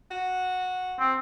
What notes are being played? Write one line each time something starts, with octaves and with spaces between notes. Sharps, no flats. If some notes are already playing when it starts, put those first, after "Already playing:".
F#4
C4